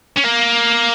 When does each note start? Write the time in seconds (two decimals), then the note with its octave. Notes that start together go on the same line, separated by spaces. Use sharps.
0.16 C#4
0.24 A#3